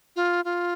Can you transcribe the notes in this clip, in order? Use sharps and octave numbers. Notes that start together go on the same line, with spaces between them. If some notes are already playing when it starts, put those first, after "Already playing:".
F4
F4